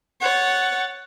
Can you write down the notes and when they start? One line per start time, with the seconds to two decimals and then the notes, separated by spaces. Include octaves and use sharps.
0.21 C#5 F#5 A6